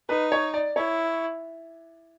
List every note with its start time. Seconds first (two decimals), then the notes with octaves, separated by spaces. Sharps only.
0.09 D#4 B4
0.32 C#5
0.54 D5
0.76 E4 C#5